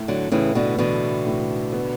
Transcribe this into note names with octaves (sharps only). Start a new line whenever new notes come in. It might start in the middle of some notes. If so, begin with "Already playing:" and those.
Already playing: A2
D3 F#3
A2 C#3 E3
B2 D3
B2 D3 E3
A2
B3